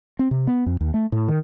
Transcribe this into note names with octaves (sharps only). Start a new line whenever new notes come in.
C4
C3
B3
F2
D#2
A3
A2
D#3